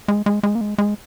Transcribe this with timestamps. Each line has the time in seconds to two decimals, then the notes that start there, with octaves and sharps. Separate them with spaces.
0.08 G#3
0.26 G#3
0.43 G#3
0.55 A#3
0.61 G#3
0.78 G#3